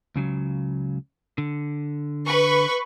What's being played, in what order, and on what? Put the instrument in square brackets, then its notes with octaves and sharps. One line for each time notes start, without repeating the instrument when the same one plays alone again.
[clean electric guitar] C#2 C#3 F#3
D3
[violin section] B4 C#6